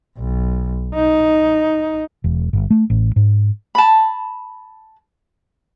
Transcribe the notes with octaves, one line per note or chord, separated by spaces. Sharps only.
B1
D#4
E1
G1
A3
A1
G#2
A5 B5